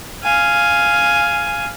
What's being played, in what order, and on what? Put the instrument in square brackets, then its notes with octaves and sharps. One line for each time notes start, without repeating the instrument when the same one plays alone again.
[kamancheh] F5 G#5